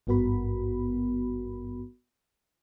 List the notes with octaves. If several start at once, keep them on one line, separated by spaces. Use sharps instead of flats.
G#1 G2 B3 F#4 A#4 B5